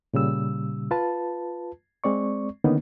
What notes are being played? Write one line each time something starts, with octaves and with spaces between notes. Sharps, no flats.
A#2 C#3 G3 E6
F4 B4 A5
G#3 C4 D5 C#6
D3 D#3 A#3 B3 C#4 D#4